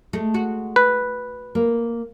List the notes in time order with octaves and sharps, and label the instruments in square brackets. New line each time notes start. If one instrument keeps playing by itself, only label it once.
[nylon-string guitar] G#3 [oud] A3
[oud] F#4
[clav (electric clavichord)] B4
[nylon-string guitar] A#3